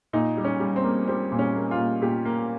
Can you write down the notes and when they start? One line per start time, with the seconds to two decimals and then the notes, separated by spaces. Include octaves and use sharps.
0.13 A#2 D#4
0.37 G3
0.44 C#4
0.60 G3
0.76 C4
0.84 A#3
1.07 G3 C4
1.32 A#2
1.39 C#4
1.55 A#3
1.71 F4
1.78 A#2
2.01 A#2 G4
2.25 A#3